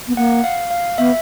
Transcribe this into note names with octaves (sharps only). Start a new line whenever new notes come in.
B3
A#3 F#5
F5
F5
B3 E5